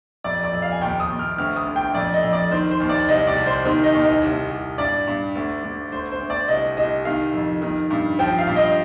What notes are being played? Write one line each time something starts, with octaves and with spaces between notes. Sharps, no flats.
F2 D5
D5
F2
F5
G#5
D#2 G5
D#6
D#2
F6
D2 F6
D#6
D2
G5
F2 D5
D#5
F2
D5
D#3 C5
C5
D#2
D5
C2 D#5
D5
C2
C5
D#3 C5
D#5
D#2
D#5
C2
C2
G2 D5
G2
D2
D2
D2 C5
C5
D2
D5
C2 D#5
C2 D#5
D#3 F5
F2
D#3
G2
F3 G5
F5
G2
D#5